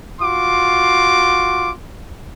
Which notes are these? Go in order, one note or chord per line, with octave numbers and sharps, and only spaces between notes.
F4 F#4 C6 D6